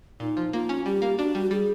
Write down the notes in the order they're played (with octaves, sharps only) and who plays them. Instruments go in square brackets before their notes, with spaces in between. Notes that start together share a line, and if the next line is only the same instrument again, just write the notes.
[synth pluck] A#2 [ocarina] D#4
[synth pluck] F3
[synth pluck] A#3 [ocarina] F4
[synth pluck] C#4
[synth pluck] G3 [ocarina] G4
[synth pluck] A#3
[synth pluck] D4 [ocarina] F#4
[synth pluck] G3
[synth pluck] G3 [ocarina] G#4